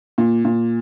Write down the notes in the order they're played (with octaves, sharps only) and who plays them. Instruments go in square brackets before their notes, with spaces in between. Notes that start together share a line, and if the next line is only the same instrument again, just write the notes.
[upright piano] A#2
A#2